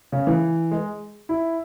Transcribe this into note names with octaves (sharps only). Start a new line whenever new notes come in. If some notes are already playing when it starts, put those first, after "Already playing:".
C#3
E3
G#3
E4